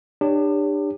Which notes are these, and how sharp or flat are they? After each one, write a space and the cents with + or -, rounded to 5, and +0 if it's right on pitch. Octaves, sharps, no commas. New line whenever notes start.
D4 +35 G4 +30 C#5 +30